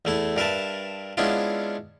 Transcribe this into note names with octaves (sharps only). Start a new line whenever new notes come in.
E2 A3 E4
G2 A#4 B4 E5 A5
G#3 B3 C#4 D4 E4 F4